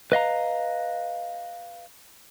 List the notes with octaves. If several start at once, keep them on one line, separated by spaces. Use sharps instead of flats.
B4 D#5 F5 A#5